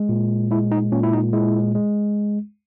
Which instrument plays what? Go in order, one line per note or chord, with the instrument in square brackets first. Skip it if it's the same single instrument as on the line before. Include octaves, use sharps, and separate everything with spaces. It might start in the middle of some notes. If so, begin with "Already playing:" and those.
Already playing: [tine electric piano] G#3
A#2
G#3 E4
D#4
A#2 C#4
E4
D#4
G#3 E4
G#3